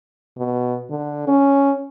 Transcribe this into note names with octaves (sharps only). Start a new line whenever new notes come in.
B2
D3
C#4